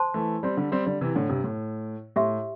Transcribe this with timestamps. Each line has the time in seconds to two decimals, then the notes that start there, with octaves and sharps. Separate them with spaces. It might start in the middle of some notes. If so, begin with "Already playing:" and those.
Already playing: C5 A5 C6
0.14 E3 A3
0.43 G3 C4
0.57 D3 G3
0.72 G3 C4
0.86 D3 G3
1.01 C3 E3
1.15 A2 D3
1.29 G2 C3
1.44 A2
2.16 A2 G4 E5 C6